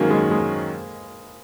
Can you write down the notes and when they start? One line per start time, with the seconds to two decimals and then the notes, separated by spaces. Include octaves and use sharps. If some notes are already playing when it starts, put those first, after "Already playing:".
Already playing: G#2 D#3 F#3 G#3 A#3 C#4 F#4
0.10 G#3
0.31 G#3